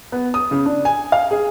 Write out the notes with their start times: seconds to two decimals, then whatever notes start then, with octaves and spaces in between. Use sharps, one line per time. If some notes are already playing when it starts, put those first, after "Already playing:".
0.12 B3
0.34 D#6
0.51 C#3
0.66 D4
0.85 G#5
1.12 F5
1.31 G#4